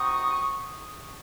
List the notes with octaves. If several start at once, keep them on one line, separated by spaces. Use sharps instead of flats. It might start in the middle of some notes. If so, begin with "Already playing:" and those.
Already playing: C4 D#4 F#4 C#6 D#6